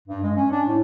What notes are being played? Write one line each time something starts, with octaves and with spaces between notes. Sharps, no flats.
G2
G#3
C#4
D4
A2